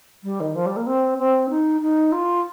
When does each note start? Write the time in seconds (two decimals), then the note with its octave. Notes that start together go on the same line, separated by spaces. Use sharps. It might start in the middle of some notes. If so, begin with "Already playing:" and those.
0.24 G3
0.40 D#3
0.55 F3
0.66 G3
0.76 A#3
0.86 C4
1.18 C4
1.49 D#4
1.81 D#4
2.12 F4